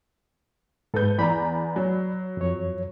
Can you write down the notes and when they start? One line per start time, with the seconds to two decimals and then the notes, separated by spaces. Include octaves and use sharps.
0.94 G#2 A4 B4 G6
1.18 E2 D5 A#5 B5
1.76 F#3
2.37 F2 C#5